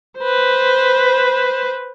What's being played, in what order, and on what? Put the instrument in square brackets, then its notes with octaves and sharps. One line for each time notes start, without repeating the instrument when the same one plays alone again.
[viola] B4 C5